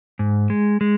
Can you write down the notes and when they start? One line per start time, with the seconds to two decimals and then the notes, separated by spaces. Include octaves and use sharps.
0.19 G#2
0.50 G#3
0.81 G#3